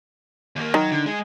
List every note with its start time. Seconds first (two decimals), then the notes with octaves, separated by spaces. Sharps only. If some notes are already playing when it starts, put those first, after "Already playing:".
0.56 D#2 A#3
0.74 D#3 F#3
0.91 D3
1.06 G#3 G#4